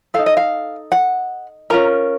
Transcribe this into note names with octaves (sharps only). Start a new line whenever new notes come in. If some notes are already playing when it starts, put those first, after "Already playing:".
D#4 A4 F5
D#5
F5
F#5
C#4 F4 A#4 A#5